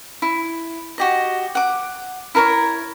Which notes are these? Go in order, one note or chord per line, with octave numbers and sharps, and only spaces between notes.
E4
F#4 G4 D#5
F#5 D6
E4 A#4 B4 C#5